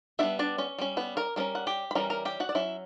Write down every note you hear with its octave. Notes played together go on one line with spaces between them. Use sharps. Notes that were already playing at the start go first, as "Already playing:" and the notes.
G3 B3 D4 E4 E5
D4 D5
C#4 C#5
G3 C#4
B3 B4
A#4 A#5
G3 A#3 C#4 A#4 A#5
F#5
G4 G5
B5
E3 G3 C#4 A#4 A#5
A#4 A#5
G4 G5
F#4 F#5
D5
F#3 C#4 E4 E5